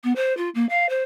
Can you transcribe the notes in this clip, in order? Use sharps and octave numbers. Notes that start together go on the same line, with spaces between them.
B3
C5
F4
A#3
F5
C5